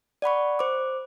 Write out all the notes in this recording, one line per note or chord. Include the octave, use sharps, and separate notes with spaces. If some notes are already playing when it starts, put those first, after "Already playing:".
D5 F#5 B5 C#6
C5 D6